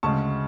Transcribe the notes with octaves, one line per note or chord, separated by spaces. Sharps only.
D2 C#3 G#3 A5 C#6